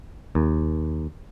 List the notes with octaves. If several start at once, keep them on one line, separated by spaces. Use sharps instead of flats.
D#2